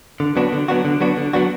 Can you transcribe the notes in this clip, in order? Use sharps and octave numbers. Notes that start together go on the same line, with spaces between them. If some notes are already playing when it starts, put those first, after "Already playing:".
D3
F#3 B3 D4 F#4
D3
F#3 B3 D4 F#4
D3
F#3 B3 D4 F#4
D3
F#3 B3 D4 F#4